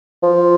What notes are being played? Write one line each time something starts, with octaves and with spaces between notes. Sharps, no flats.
F3